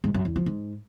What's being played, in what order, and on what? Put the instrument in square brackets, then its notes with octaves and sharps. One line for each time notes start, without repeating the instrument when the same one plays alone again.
[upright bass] G#2
F#2
E2
F3
G#2